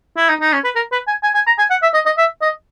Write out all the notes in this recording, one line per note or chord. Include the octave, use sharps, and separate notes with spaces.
E4
D#4
D#4
C#4
B4
A#4
B4
G#5
G#5
G#5
A#5
G#5
F#5
E5
D#5
D#5
E5
D#5